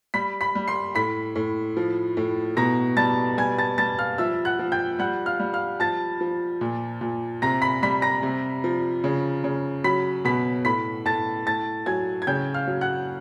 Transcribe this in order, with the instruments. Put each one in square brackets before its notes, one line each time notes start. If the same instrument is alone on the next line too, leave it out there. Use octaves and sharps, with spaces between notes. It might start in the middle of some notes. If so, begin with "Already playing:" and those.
[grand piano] G3 B5 B6
B5 B6
G3
C6 C7
A2 B5 B6
A2
F3
A2
B2 A#5 A#6
G3 A5 A6
G3 G#5 G#6
A5 A6
G3 A5 A6
F5 F6
F3 E5 E6
F#5 F#6
F3
G5 G6
G3 F#5 F#6
F5 F6
G3
F5 F6
F3 A5 A6
F3
A#2
A#2
C3 A#5 A#6
B5 B6
G3 B5 B6
A#5 A#6
C3
F3
C#3
C#3
F#3 B5 B6
B2 B5 B6
A2 B5 B6
A2 A5 A6
A2 A5 A6
F#3 G#5 G#6
G#6
C#3 G5 G6
F5 F6
F#3
F#5 F#6